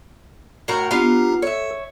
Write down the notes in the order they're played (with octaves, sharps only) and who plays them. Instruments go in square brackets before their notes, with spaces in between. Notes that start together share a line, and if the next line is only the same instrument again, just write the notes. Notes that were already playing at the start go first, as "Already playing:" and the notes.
[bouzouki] A2 F#4 A#4
[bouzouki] B3 F4 F5 [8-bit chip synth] D4 G4 A#5
[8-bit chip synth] A4 [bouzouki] C#5 E5